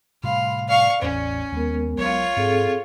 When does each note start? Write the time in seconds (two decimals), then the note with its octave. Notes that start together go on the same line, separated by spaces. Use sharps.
0.23 A2 C3 G3 F5 B5 C6
0.69 D5 F5 C#6
1.02 A1 E2 A2 C#4
1.52 D#2 G#3 B3 A#4
1.98 B1 F#3 F4 C#5
2.37 G#2 C4 G#4 A4